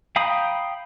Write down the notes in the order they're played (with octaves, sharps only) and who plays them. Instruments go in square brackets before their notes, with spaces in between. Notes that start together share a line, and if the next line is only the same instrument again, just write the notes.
[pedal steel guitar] F5 G5 A#5 B5 D#6